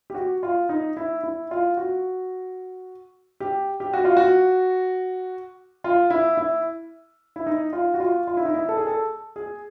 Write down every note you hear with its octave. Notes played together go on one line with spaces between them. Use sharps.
G4
F#4
F4
D#4
E4
E4
F4
F#4
G4
G4
F#4
F4
F#4
F4
E4
E4
E4
D#4
F4
F#4
F4
F4
E4
D#4
E4
A4
G#4
A4
G#4